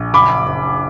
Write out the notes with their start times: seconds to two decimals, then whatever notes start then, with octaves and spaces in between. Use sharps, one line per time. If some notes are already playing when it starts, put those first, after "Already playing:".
Already playing: A#1
0.13 F#1 B5 D6
0.46 F#1